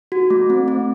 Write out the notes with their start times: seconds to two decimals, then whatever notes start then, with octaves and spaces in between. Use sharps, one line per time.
0.12 F#4
0.30 A3
0.50 C4
0.68 C4